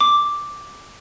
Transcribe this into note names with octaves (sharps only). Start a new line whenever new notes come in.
D6